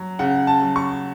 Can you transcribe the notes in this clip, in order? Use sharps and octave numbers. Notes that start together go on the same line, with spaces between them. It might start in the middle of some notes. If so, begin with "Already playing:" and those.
Already playing: F#3
C#3 F#5
A5
F#3
C#6